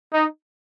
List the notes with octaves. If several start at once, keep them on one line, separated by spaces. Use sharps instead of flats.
D#4